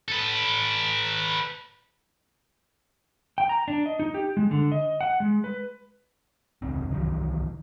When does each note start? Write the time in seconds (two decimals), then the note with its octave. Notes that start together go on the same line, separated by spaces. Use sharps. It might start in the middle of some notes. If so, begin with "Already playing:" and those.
0.08 A4 B4
3.38 G5
3.49 A#5
3.68 D4
3.86 D#5
4.00 D#4
4.14 G4
4.37 G#3
4.51 D3
4.72 D#5
5.01 F#5
5.20 G#3
5.44 B4
6.62 E1 C#2 C3 C4
6.92 C2 D#3 E3 F#3